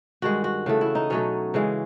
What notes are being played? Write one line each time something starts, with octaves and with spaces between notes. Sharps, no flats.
G2 D#3 G#3 F#4
F#4
C#3 E3 A3
E4
D#4
B2 F#3 A3 C#4
C#3 E3 G#3